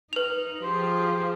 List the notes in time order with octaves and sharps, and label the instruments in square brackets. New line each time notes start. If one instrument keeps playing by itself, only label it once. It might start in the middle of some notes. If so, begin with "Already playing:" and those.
[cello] D#4 [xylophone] B4 F7
[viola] F3 [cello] G4 G#4 [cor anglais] C5